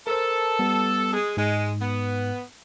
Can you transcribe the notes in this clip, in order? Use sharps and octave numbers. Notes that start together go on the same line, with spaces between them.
A4 A#4 C5
G3 B3
G#3 G#4
G#2 G#3
B3